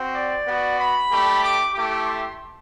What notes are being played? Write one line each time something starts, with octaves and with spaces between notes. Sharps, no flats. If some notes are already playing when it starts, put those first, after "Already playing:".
Already playing: C4 F#4
D5
B3 F#4
B5
A3 D4 G4
D6
A3 E4 G4 D6
C6